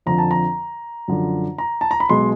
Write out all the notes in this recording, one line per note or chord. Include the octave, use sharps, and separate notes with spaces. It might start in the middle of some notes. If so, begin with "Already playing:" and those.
F2 D3 F3 A#5
A5
A#5
F#2 D3 F3
A#5
A5
A#5
B5
B1 B2 G#3 C6